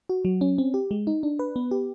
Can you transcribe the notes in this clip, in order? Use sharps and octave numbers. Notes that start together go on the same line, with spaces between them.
F#4
F#3
C#4
C4
G4
G#3
D#4
D4
B4
B3
G4